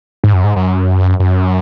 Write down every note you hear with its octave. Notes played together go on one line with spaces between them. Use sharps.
G#2
F#2
G#2
F#2
F#2